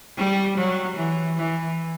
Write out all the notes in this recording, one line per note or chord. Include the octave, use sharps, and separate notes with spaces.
G3
F#3
E3
E3